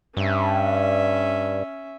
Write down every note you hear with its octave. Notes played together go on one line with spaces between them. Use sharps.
G2 C#4 E5